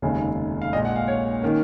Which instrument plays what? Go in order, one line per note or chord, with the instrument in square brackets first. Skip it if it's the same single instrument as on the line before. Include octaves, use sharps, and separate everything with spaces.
[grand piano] F1 D#2 C#3 G#3
F5
A#1 A#2 G#3 D#5
F#5
F5
C#5
D#3 A#3 C#4